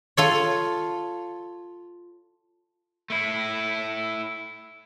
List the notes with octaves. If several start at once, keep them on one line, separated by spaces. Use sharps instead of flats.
F4 A4 C#5
A3 E4